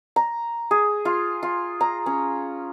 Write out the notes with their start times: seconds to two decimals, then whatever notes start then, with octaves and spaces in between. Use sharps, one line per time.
0.16 A#5
0.71 G#4
1.05 F4
1.43 F4
1.81 A#5
2.06 C#4